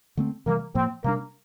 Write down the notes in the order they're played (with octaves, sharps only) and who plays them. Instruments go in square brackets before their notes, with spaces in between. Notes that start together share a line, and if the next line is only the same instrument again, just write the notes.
[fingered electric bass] D3 A3 C4
[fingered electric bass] C3 E3 G3 [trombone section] A#3
[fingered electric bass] A2 F3 A#3 [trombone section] C4
[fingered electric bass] C3 G3 D4 [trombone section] A#3